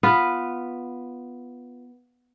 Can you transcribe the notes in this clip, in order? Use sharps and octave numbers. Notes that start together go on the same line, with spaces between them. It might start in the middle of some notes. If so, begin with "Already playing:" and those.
B3 F4 B4